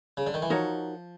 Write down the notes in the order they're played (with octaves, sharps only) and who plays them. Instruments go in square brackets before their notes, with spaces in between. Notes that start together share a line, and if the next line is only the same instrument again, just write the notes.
[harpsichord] C#3
D3
D#3
E3
[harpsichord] F3 [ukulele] D#4 F#4 A#4 C#5